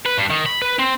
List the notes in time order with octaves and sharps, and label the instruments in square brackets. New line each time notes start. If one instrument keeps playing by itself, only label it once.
[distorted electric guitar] B4
G2
D#3
B5
B4
C4